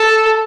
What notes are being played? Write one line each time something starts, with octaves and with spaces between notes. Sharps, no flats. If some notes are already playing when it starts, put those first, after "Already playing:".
Already playing: A4